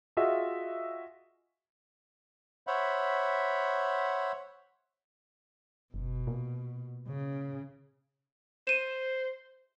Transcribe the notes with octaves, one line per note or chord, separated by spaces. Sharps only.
F4 F#4 G#4 D#5 E5
C5 C#5 E5 F#5 B5
F#1 B2
A#2
C#3
C5 D#7 E7